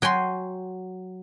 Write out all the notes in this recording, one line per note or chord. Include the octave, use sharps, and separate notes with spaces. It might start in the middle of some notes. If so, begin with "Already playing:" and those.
F#3 G5 G#5 C6